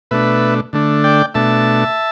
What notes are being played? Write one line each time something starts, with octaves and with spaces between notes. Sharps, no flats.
B2 A3 D4 B4 E5
D3 A3 D4
D5 G5
B2 A3 D4 E5 A5